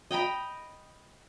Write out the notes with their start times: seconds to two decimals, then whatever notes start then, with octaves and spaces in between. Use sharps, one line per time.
0.11 D#5 G5 A#5 B5